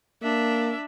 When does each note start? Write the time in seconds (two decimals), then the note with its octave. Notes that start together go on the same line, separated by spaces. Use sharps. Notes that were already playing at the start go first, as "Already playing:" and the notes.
0.22 A#3 D4 E5